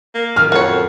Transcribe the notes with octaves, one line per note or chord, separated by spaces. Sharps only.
A#3
F#2 A#2 D#3 F6
F2 F#4 C#5